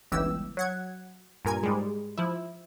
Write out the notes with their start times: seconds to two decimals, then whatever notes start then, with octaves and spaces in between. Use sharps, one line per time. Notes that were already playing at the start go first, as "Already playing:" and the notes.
0.12 G1 C#2 E3 G4 E6
0.57 F#3 F#5 G#6
1.45 G2 A#2 A#4 G#5 G#6
1.63 G#2 G3 G#3
2.17 F3 E4